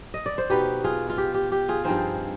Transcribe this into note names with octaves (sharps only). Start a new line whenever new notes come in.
D#5
D5
C5
B2 B3 D#4 G4 B4
F4 G#4
F4
G4
G4
G4
F4 G#4
G2 F3 C4 D#4 G#4 C5